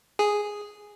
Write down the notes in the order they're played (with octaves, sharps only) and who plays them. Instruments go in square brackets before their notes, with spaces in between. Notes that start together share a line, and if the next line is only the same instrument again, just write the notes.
[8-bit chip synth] G#4